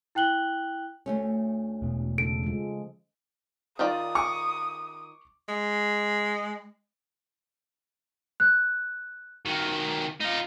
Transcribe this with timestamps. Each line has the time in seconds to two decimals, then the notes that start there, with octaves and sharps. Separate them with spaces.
0.15 E4 G5 F#6 F#7 G7
1.06 D2 A3 C#4
1.82 E1 B2
2.18 C#3 A4 D7
2.43 F3 G#3
3.79 D#3 F4 D5 D#6
4.15 C#6 D6
5.49 G#3
8.40 F#6
9.46 D#3 F#3
10.20 D#4 F4